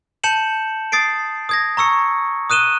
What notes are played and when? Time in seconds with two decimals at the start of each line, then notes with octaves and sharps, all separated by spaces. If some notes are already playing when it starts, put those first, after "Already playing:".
0.24 A5 G6 C#7 E7 F#7
0.92 D#6 A6 C7 D7
1.49 D#6 G#6 A#6
1.77 A#5 C#6 E6 C#7
2.50 D#6 F#6 D#7 E7 G7